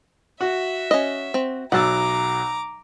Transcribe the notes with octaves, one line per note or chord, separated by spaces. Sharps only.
F#4 E5
C#4 D#5
C4
B1 F#3 F#5 A5 A#5 D6 E6